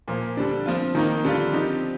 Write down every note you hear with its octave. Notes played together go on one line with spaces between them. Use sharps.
A#2 F3 A#3
D3 G3 D4
F3 C4 F4
D#3 A#3 D#4
D3 G3 D4 F4
F3 C4 D#4 G4